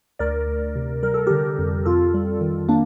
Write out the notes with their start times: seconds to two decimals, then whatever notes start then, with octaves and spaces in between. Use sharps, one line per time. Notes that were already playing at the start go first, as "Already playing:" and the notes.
0.19 D2 A#4 D5
0.47 D2
0.75 C3
1.03 G3 A#4
1.14 A4
1.27 D3 G4 A#4
1.59 F2
1.85 F2 F4 A4
2.14 G3
2.41 D#3
2.69 A#3 D4